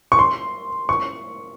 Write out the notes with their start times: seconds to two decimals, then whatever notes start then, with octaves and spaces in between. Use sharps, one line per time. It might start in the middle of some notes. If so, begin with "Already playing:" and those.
0.12 C#6
0.19 C6
0.89 C#6